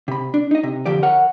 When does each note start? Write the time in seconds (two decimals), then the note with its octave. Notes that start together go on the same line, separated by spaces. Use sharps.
0.08 C3 B5
0.34 D4
0.51 D#4 D#5
0.63 C3
0.86 F2 D3 F3 G4 D5
1.03 A#4 C#5 F#5